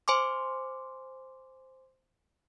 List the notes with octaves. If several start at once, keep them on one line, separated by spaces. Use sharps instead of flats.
C5 G#5 C6 D6